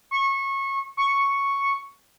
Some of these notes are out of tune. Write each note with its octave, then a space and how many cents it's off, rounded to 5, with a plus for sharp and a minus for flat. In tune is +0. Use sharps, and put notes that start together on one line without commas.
C#6 -25
C#6 +0